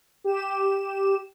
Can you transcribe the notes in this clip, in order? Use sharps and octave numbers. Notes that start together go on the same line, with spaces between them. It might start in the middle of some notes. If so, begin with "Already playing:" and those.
G4 E7